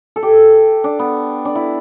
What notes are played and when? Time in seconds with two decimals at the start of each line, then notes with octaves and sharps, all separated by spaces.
0.16 A4
0.23 G4
0.84 D4
0.99 B3
1.45 D4
1.55 E4